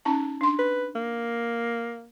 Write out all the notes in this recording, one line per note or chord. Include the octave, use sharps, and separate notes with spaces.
C#4 D#4 A5
D4 C6
B4
A#3